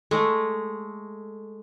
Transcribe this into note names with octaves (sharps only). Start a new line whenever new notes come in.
G#3 A3